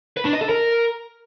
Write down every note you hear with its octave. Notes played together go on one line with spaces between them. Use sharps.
B4
D4
D#5
A4
A#4